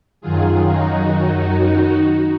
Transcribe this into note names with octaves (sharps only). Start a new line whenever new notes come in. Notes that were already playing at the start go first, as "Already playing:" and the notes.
F#2 D#3 F#3 F4 G#4
D#4 F#4